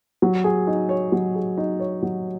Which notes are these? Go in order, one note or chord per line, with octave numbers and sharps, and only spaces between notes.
F#3
G#4
D#4
C#5
F#3
G#4
D#4
C#5
F#3